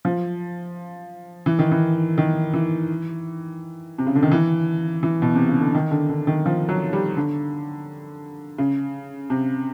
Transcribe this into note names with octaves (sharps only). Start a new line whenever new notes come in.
F3
E3
D#3
E3
D#3
E3
C3
C#3
D3
D#3
E3
E3
B2
C3
C#3
D3
D#3
D3
D3
D#3
F3
F#3
G3
D3
C#3
C3